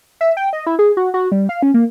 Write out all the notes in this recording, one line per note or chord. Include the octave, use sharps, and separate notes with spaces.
E5
G5
D#5
E4
G#4
F#4
F#4
G3
F5
C#4
A#3